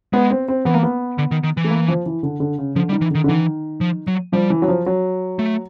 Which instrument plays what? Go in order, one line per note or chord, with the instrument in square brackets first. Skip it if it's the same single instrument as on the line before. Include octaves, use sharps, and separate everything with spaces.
[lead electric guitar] G#3 [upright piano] B3
[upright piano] C4
C4
[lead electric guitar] E3 [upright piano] B3
[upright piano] A#3
B3
[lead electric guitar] D3
D#3
D#3
E3
[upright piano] A3
A#3
F3
E3
D3
D3
C#3
[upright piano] D3 [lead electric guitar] F3
[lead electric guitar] G3
[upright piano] D#3
[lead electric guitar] E3
[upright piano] D3 [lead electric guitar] D#3
[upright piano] D3
[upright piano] D#3 [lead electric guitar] E3
[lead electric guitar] F3
F#3
[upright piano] F3 [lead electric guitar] G3
[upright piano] E3
F#3
F3
F#3
[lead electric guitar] A3